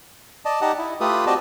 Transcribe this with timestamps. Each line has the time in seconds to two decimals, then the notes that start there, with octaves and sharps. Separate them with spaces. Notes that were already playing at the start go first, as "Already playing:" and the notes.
0.45 D5 D#5 A5
0.61 D#4 G4 D#5 F#5 A5
0.78 E4
1.00 A3 F4 G4 A4 B4 D#6
1.27 C4 F#4 G4 D5 D#5 A5